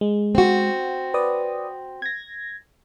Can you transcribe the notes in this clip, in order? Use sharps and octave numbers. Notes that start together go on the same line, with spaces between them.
G#3
C4 F#4
B4 D5 D#6
G#6 A#6